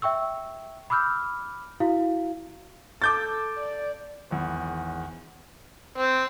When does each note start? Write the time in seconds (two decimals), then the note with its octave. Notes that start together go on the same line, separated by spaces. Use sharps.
0.02 E5 G5 C#6 E6
0.90 B5 D6 E6 F6 G6
1.80 E4 F#4 F5
3.02 A4 D6 G6 A6
3.57 D5
4.31 G#1 E2
5.98 C4